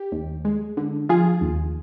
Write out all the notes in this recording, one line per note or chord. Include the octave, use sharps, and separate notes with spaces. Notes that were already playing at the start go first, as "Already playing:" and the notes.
Already playing: G4
D#2
G#3
D3
F3 F4 G#4
D#2